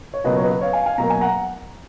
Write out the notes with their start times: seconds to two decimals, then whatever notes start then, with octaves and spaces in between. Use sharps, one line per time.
0.14 C#5
0.24 C#2 B2 F#3 A#3 B4 D#5
0.37 C#5
0.43 B4 D#5
0.61 C#5 F5
0.73 F5 G#5
0.86 F5 G#5
0.98 B2 F#3 A#3 A#5
1.10 G#5
1.21 F#5 A#5